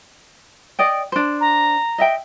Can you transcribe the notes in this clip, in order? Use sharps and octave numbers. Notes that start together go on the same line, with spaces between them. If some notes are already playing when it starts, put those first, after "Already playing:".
D5 D#5 G5
D4 C5
A#5
D#5 E5 G5